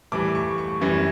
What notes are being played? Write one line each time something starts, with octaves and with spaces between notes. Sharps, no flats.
A2 E3 G3 D6
C#6
C#6
F#2 E3 G3